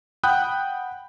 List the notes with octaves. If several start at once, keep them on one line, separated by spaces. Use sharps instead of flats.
F#5 G5 B5 D#6 F#6 G6